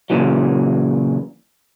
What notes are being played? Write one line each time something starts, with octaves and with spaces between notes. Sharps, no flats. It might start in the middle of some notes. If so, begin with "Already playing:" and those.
A#2 C#3 E3 F#3